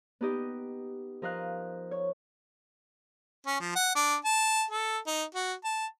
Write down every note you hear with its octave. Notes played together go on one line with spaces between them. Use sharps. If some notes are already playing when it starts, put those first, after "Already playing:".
B3 D#4 G4 D#5
F3 A#4 D#5 F5 F#6
C#5
C#4
F3
F#5
D4
A5
A4
D#4
F#4
A5